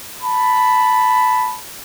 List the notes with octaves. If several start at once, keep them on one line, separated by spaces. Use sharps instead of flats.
A5 B5